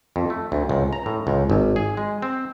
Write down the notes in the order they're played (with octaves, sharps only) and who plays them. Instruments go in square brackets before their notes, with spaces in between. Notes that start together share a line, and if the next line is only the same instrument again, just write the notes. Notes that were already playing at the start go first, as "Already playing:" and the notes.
[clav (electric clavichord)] F2
A3
D2
C#2
A#5
A2
C#2
G#1
G#4
G#3
C4